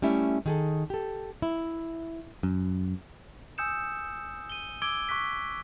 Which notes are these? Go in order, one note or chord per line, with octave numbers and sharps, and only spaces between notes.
G3 A3 C#4 E4 E5
D#3 G#4 A4
G4 A4
E4
F#2
G#5 D#6 E6 G6 C#7 E7
D#7 G7
D6 E6 G#6 D7 G7
C#6 D6 F#6 B6